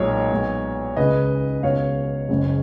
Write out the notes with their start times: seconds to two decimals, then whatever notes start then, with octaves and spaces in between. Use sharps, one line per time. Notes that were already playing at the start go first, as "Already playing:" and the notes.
Already playing: B1 A#2 G#3 C#5
0.31 B1 B2 G#3
0.97 C#2 C#3 G#3 B4 D#5
1.63 C#2 B2 G#3 C#5 F5
2.29 F#1 F#2 C#3 G#3